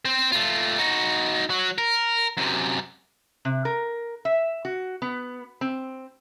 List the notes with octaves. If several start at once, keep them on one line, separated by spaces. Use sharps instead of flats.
C4 C5
A3 F4
D#4 F#4
F#3 F#4
A#4
F#2 C3
C3
A#4
E5
F#4
B3
C4